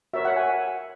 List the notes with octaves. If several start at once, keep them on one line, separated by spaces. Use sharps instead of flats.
F#4 A#4 C#5 E5
F#5
G#5